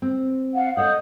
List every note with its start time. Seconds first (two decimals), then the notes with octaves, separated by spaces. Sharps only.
0.02 C4
0.55 F5 F#5
0.77 A4 C#5 D#5 F#5 D#6 G6